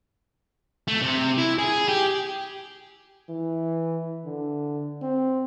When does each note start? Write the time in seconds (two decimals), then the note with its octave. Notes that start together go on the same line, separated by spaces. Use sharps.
0.88 A3
1.02 C3
1.38 E4
1.58 G#4
1.88 G4
3.29 E3
4.25 D3
5.02 C4